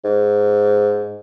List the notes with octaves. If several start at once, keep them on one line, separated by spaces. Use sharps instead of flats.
G#2